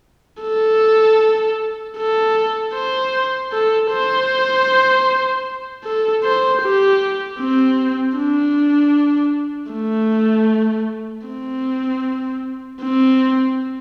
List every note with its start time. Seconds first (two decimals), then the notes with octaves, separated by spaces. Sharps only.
0.42 A4
1.98 A4
2.75 C5
3.52 A4
3.92 C5
5.84 A4
6.24 C5
6.62 G4
7.40 C4
8.17 D4
9.72 A3
11.27 C4
12.82 C4